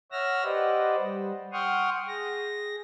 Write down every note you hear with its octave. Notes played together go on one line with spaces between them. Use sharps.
C#5 E5 F#5 E6 F6 A#6
G4 B4 C5 D5 D#5 F#5
G3
F#5 G5 C6 C#6 D#6 F6
G#4 A#6